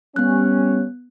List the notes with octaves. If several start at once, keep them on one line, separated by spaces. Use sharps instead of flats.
G3 B3 C#4 F#6